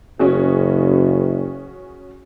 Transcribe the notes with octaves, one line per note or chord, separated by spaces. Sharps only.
F#1 C#4 F#4 G#4